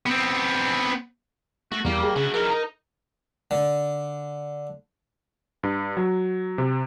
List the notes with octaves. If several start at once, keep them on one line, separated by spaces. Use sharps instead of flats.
B3 C4
A3 F#4
E2 G3 A#3
G#4
C#3 A3 F#4
E3 D#4 A#4
D#4
D3
G2
F#3
C3